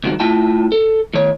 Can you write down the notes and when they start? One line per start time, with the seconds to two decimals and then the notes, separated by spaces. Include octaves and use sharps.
0.04 C#2 G2 D#3 G#3 F#4
0.20 A3 E4 F4 G5 A5
0.72 A4
1.14 A2 D#3 C#5